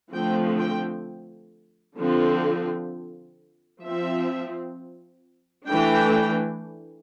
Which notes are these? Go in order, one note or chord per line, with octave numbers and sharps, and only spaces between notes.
D3 F3 A3 C4 G5
G5
D3 F3 C4
F3 C4 E5
E3 A3 D4 G5